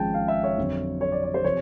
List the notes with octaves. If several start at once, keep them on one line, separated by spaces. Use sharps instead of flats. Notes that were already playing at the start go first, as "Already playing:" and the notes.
Already playing: G#1 G#2 F3 G#3 C#4 G5 A5
F5
E5
C#5
F2 D3 F#3
C#5
D5
D5
C5
C3 F3 C#5